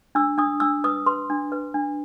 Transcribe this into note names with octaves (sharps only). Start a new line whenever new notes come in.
D4 E6
D4 D#6
D4 E6
B4 D#6
B4 C6
D4
B4
D4